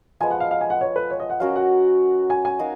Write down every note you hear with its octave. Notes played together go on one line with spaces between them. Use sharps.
F3 G#3 B3 G#5
F#5
F5
F5
G#5
F#5
C#5
B4
C#5
D#5
F#5
F#3 C#4 F#4 A#4 F5
F#5
G#5
G#5
D#4 F#4 A#4 F5